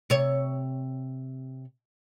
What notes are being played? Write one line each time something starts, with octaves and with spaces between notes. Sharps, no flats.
C3 C#5